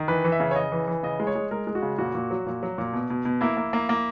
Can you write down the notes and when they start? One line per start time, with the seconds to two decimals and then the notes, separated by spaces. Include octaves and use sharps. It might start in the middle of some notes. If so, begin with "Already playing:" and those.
Already playing: D#3
0.08 E3 B4
0.24 E3
0.32 E5
0.40 C#3
0.51 C#5
0.56 C#3 D#5
0.72 E3
0.87 E3
1.03 C#3 D#5
1.20 G#3
1.27 C#5
1.35 G#3
1.51 G#3 A#4
1.67 G#3
1.75 F#4
1.82 C#3
1.98 A#2 F#4
2.15 A#2
2.31 F#3
2.46 A#2
2.63 F#3
2.78 A#2
2.93 B2
3.10 B2
3.25 B2
3.41 A#3 E4
3.57 A#3
3.73 A#3
3.89 A#3